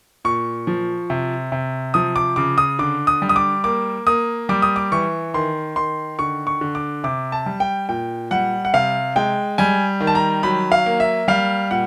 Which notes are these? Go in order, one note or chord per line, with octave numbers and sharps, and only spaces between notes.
A#2 C#6
F3
C3
C3
F3 D#6
D6
C#3 D6
D#6
D3 D6
D#6
G3
D#6
D6
A#3 D6
A#3 D#6
G3 D6
D#6
D6
E3 C#6
D#3 C6
D#3 C6
D3 C#6
C#6
D3
D6
C3 D6
A5
G3
G5
A#2 G5
G3 F#5
F#5
C3 F5
G#3 G5
G3 G#5
D#3
A5
A#5
F#3 B5
F5
A#3
E5
G3 F5
A#2 F#5